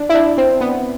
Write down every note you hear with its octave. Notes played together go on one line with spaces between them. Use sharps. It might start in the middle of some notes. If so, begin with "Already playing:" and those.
Already playing: D4
E4
D4
C4
B3